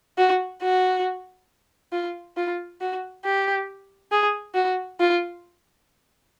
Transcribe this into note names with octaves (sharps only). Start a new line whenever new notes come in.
F#4
F#4
F4
F4
F#4
G4
G#4
F#4
F4